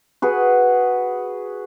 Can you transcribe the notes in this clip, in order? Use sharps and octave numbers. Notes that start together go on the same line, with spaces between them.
F#4 G#4 B4